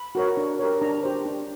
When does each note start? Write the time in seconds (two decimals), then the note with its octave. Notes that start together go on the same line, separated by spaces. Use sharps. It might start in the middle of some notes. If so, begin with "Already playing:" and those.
Already playing: B5
0.15 F#4 A#4 C#5
0.37 D4
0.59 G4 A#4 C#5
0.81 D4 A#5
1.03 G4 C5
1.25 D4